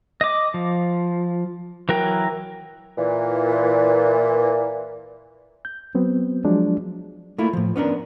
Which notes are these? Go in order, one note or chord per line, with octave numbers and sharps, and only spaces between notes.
D#5 D6
F3
E3 F#3 A#4 G5
A#2 E3
G6
F#3 B3 C4
F3 F#3 G#3 D4
A3 A#3 E4 F4
A2 F3
B3 C#4 D4 A#4